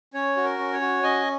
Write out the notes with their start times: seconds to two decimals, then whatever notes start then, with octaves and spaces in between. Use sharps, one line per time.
0.14 C#4 C#5
0.37 F#4
0.44 A#4
0.58 C#4
0.73 C#5
0.81 F#4
1.03 C#4 D#5 G#5